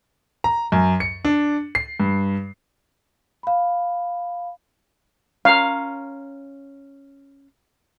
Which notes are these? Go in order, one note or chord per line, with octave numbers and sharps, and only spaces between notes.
A#5
F#2
C#7
D4
C7
G2
F5 B5
C#4 F5 A#5